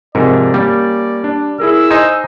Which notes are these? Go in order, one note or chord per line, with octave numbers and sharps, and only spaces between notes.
G#2 C3 F3 A#4 D5
G3 A#3 C#4
D4
E4 G#4 A#4 E6
D#4 C5 D#5 G#5 C6